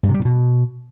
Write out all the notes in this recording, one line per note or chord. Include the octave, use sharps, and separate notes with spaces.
G2
C3
G3
A#2
B2